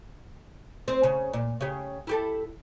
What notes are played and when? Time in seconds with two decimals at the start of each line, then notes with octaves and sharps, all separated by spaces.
0.88 C4 C5
1.03 C#3
1.33 A#2
1.61 C#3 G4
2.07 E4 G4 A4